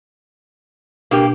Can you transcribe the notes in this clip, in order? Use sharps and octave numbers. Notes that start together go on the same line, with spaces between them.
B2 A#3 D4 G4 A#4